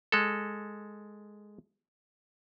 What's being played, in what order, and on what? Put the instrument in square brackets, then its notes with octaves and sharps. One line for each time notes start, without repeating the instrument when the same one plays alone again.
[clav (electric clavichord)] G#3 A4